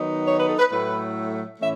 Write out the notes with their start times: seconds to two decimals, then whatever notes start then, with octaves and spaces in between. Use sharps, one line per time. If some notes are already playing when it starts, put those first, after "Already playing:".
Already playing: D#3 F#3 B3 D#4
0.26 C#5
0.36 B4
0.47 A4
0.58 B4
0.70 A2 F#3 A3 E4 B4
1.60 A2 E3 A3 C#4 E4 E5